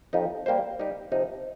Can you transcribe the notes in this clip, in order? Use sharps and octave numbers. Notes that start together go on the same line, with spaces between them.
F2 F3 D#4 G4
G3 A#3 G4 C5
G3 D#4 G4
C3 F3 D#4